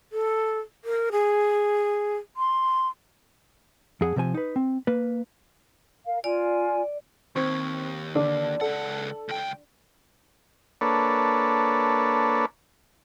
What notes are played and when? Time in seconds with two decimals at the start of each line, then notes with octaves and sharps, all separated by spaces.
0.12 A4
0.84 A#4
1.12 G#4
2.37 C6
4.01 F2 G#4 F#5
4.16 C3 F3 C5 G#5
4.34 D#4 B4
4.56 C4
4.87 A#3 B4
6.06 A#4 F5
6.24 F4 D5 G#5
7.36 D#2 C4 C#6 G#6
8.15 D3 D4 D5
8.61 C#2 A4 F#5
9.28 C#2 G5
10.81 A#3 D4 A4 B4 C#5